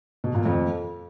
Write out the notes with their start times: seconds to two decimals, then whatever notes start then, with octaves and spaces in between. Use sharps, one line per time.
0.24 B2
0.35 A#2
0.45 F2